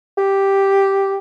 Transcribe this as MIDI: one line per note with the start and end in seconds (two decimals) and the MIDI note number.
0.18 1.17 67